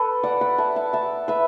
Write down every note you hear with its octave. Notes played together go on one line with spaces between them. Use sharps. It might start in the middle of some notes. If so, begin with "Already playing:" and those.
Already playing: A4 B4
D5 F#5
F#5 B5
E5 A5
E5 A5
E5 A5
B4 E5